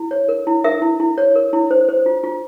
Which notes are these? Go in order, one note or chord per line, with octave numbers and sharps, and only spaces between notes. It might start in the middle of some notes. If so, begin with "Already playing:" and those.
Already playing: E4
C#5
A#4
E4
A#4 E5
E4
E4
C#5
A#4
E4
C5
C5
F4
F4